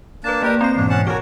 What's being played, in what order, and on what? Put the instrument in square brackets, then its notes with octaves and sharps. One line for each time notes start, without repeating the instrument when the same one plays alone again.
[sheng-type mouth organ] A#3 D4 A5 [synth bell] B4 A6
[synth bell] A#3 D5 [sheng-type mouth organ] G4 A#4 B4
[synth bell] C4 C7 [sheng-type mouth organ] C5 [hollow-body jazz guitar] A#5
[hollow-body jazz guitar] E2 G#2 B2 [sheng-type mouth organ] D4
[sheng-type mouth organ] C#4 F#5 A5
[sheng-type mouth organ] F#4 C#5 G#5 [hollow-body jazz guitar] G4 A#4 [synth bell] F6